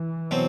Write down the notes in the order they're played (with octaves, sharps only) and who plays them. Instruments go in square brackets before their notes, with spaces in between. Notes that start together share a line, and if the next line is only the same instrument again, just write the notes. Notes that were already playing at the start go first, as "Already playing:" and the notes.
Already playing: [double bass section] E3
[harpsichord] B2 F#3 C4